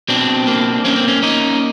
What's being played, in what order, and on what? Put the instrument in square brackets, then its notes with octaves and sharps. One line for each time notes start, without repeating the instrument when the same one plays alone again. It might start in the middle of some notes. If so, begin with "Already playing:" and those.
[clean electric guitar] B2 C4 D4
A#3
A#3 C#4
C4
C#4
A#3 C#4 D#4